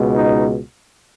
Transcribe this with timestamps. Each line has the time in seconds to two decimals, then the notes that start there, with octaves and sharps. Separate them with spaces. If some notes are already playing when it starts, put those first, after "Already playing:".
Already playing: C#2 B2 G#3
0.15 D#4